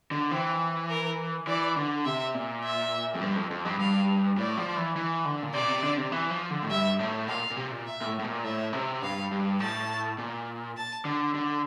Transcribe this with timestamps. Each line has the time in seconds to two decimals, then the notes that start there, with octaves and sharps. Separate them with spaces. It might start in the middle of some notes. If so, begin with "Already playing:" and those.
0.11 D3
0.31 E3 C4
0.90 A#4
1.47 E3 D5
1.76 D3
2.05 C3 E5
2.34 A#2
2.64 E5
3.15 F2
3.21 G2
3.36 F2
3.51 F2
3.65 G2
3.79 G2 F5
4.37 A2 D5
4.57 F3
4.77 E3
4.96 E3
5.25 D3
5.43 A#2
5.54 C3 D5
5.62 A#2
5.69 C3
5.83 D3
5.97 C3
6.12 E3
6.31 F3
6.50 D3
6.63 A2
6.70 G2 E5
6.99 A2
7.28 A#2 F5
7.51 A#2
7.57 C3
7.71 A#2
7.86 E5
8.01 A#2
8.06 A2
8.19 A2
8.24 A#2
8.44 A2 E5
8.73 C3
9.02 G2 F5
9.31 G2
9.60 A2 A5
10.18 A#2
10.77 A5
11.05 D3
11.34 D3